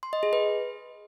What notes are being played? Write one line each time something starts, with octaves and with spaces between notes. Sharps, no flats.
C6
D#5
G#4
B4